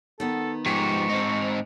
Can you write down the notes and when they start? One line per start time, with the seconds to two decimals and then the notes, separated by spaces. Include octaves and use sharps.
0.20 D#3 B3 A4
0.66 G#2 F3 G4 C#6
1.09 C4 D#4